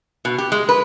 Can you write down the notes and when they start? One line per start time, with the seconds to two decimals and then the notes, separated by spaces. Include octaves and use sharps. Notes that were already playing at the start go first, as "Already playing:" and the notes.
0.25 B2
0.38 G4
0.52 G#3
0.69 B4